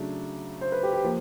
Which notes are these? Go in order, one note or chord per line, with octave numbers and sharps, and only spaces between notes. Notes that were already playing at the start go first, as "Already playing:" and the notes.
Already playing: C#3 F#3 A3 D4
C5
B4
G4
G4
F3 A#3